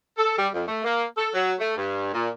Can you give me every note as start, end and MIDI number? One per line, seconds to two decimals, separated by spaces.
0.17 0.37 69
0.37 0.47 55
0.54 0.63 41
0.67 0.82 57
0.84 1.04 58
1.17 1.28 69
1.34 1.53 54
1.59 1.73 57
1.76 2.13 43
2.14 2.29 46